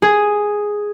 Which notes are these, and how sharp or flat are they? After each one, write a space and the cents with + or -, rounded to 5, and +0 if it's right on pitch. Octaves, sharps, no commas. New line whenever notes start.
G#4 +0